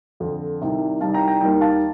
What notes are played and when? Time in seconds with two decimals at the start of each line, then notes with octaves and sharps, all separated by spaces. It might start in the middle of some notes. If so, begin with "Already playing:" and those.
0.20 F2 D3 F3
0.61 C2 C3 D#3 G3
1.01 C2 C3 D#3 G3 F5 A5
1.14 G5 A#5
1.28 G5 A#5
1.41 D#2 D#3 G3 G5 A#5
1.61 F5 A5